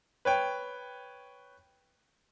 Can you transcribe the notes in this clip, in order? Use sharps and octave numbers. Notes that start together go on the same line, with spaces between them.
B4 C#5 G5